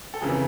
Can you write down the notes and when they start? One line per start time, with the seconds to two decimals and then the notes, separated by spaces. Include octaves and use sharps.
0.14 A4
0.21 F2 C#3 E3 G#4 A#4